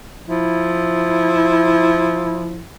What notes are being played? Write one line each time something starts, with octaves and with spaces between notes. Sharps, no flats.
F3 E4